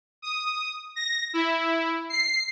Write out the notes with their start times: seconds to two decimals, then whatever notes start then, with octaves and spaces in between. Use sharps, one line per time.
0.22 D#6
0.96 A#6
1.33 E4
2.10 C7